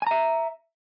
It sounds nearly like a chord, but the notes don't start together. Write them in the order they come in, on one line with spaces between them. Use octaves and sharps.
G#5 A#5 E5